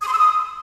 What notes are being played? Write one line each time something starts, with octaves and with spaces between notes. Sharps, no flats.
D#6
C6
E6
D#6